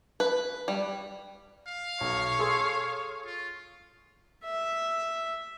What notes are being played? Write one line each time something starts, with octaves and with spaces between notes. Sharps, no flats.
B4
G3
F5
B1 C#5
G#4 A4 C6
F4
E5